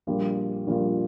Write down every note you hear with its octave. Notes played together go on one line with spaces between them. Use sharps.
A#1 A#2 G3 A#3 F4
A#1 A#2 G3 A#3 F4